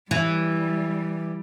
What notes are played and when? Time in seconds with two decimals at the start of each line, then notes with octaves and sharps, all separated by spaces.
0.11 E3 G3